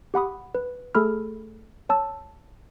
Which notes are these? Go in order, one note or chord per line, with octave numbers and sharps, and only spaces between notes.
G4 F#5 B5 D#6
B4
A3 G#4 A4 B5 F6
C#5 A5 E6